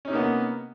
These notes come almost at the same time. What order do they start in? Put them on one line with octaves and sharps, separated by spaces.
C#4 D#4 C3 A#3 B3